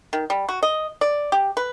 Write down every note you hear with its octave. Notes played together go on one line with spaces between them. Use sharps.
D#3
G3
F#4
D#5
D5
G4
B4